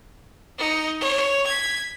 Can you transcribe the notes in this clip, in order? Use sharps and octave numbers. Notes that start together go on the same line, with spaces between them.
D#4 C#7
C#5
G#6 B6